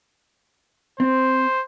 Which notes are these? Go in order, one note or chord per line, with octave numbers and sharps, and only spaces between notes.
C4 C5